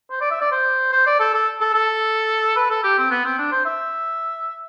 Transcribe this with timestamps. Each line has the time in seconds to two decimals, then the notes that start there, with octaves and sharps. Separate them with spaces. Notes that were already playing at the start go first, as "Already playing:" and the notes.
0.11 C5
0.21 D5
0.31 E5
0.41 D5
0.51 C5
0.92 C5
1.06 D5
1.20 A4
1.34 A4
1.61 A4
1.74 A4
2.56 B4
2.70 A4
2.84 G4
2.98 C4
3.10 B3
3.25 C4
3.38 D4
3.52 C5
3.65 E5